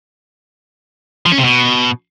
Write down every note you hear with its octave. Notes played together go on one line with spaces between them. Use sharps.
F3
C#4
C3
B2